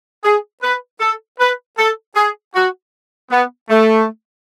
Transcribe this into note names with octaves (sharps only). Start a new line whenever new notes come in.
G#4
B4
A4
B4
A4
G#4
F#4
B3
A3